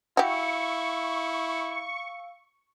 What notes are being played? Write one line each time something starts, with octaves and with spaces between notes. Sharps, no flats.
E4 F#4 G4 F5 C#6 E6